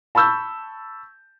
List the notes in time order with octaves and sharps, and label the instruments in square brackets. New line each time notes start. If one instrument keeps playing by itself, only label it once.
[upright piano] A5 B5 C#6 E6 G6